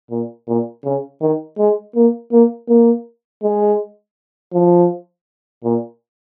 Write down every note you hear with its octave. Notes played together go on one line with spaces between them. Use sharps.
A#2
A#2
C#3
D#3
G#3
A#3
A#3
A#3
G#3
F3
A#2